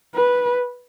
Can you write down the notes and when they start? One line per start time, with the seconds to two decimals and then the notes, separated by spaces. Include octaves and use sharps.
0.15 B4